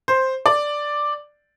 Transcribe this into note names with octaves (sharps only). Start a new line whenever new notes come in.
C5
D5